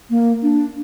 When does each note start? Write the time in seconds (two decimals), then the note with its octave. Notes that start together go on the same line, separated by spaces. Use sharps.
0.10 A#3
0.43 D4